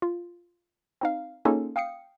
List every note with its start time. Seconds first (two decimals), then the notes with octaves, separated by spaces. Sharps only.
0.02 F4
1.01 C4 D#4 F5
1.45 A#3 C#4 D#4 F4 G#4 A4
1.76 F5 G5 D#6 C7 C#7